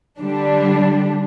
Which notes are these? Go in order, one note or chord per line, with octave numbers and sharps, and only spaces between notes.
D3 G3 D4